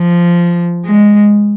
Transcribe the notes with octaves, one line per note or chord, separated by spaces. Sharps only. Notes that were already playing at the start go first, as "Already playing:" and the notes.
Already playing: F3
G#3